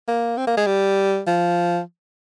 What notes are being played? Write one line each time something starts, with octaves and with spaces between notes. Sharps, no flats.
A#3
C4
A#3
G#3
G3
F3